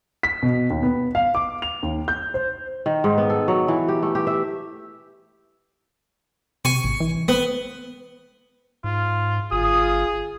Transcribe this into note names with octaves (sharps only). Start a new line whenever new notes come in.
B6
B2
D#2
B3
F5
D6
F7
D#2
G6
C5
D#3
G#2
B3
A4
F#3
E3
G4
A3
G4
E5
C3 G#5 C#6
A1
E3
B3 C4
G#2 F4
G1 F4 G#4 D#6